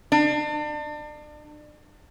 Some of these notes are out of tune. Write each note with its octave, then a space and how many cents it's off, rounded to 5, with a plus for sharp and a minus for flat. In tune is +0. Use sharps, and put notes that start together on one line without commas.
D4 +35